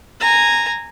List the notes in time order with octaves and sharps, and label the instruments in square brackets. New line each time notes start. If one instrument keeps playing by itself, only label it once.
[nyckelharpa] G#5 A#5